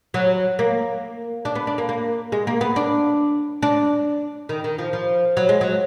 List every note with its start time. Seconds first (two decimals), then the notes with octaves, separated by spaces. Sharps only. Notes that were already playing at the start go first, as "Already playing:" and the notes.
0.14 F#3
0.59 A#3
1.45 D4
1.55 B3
1.67 D4
1.78 A#3
1.89 A#3
2.32 G#3
2.47 A#3
2.61 B3
2.76 D4
3.62 D4
4.49 D#3
4.64 D#3
4.78 F3
4.93 F3
5.37 F#3
5.49 G#3
5.61 F#3